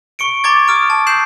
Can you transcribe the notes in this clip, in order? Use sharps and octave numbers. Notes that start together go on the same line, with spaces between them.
C#6 C#7 D7
A#5 C#6 D6 G#6 A6
D#6 F6 D7
A5
G6 C7 E7 F#7